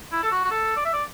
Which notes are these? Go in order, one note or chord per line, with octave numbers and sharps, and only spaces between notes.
E4
A4
F#4
F#4
A4
D5
E5
D5